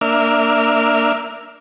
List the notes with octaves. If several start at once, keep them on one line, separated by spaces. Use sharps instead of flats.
A#3 D4 E5 F6